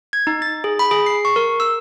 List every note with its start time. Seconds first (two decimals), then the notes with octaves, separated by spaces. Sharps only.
0.13 G#6
0.27 D#4
0.42 A6
0.64 G#4
0.79 B5
0.91 G#4
1.06 C7
1.25 C#6
1.36 A#4
1.60 E6